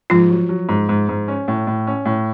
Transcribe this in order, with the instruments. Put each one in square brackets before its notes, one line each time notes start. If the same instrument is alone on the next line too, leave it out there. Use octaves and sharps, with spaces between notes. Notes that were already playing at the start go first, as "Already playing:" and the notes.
[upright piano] G#2 [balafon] F3 F4
[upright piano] F#3
F#3
G#2
G#2
G#2
C#4
A2
A2
C#4
A2